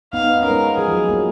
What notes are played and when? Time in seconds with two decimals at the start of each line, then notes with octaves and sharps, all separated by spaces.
0.13 B3 D#4 F5
0.24 B3 D#4
0.35 B3
0.43 C#4 A#4
0.50 G#3 B3
0.77 F3 G#4
0.88 F3
0.93 F#3
1.09 F#3 A#3